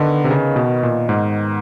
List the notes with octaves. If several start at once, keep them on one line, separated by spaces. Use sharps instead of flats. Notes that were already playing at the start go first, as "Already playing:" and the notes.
Already playing: D3 D#3 B3
C3
C#3
B2
A#2
G#2